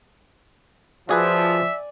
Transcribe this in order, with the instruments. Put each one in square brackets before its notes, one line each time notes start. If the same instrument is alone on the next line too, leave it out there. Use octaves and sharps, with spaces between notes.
[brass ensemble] F3 [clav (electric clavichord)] F#4 G#4 B4 [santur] D5 G#5 [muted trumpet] E5